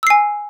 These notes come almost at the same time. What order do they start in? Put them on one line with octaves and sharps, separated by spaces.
E6 C7 G#5